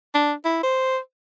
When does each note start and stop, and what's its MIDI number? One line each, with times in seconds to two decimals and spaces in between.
0.15 0.33 62
0.45 0.61 64
0.63 0.98 72